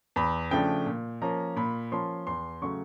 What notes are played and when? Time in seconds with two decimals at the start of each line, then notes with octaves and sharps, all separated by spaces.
0.16 E2 B5
0.51 C#3 F3 A3 D4 G5
0.86 A#2
1.22 F3 A#3 C#4 A#5
1.56 A#2 B5
1.91 F3 A#3 C#4 C6
2.27 E2 C6
2.62 C#3 F#3 A3 C#6